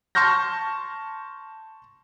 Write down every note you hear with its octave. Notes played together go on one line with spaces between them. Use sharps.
A5 C6 C#6 F6 G6 A#6